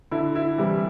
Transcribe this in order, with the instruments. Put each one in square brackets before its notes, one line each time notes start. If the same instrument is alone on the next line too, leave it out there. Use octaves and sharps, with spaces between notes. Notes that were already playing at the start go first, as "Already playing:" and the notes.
[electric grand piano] D3 [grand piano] E4
[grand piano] E4
[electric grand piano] C3 E3 [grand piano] G3